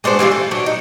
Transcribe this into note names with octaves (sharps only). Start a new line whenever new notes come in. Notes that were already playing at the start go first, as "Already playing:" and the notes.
G#3 D4 F#4 C5
E3 G3 E4 F4
A3
F#3 D4
D#4